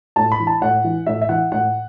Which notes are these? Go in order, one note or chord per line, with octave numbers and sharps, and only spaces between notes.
A2 A5
B5
E3
A5
A2 F#5
E3
A2 E5
E5
E3 F#5
A2 F#5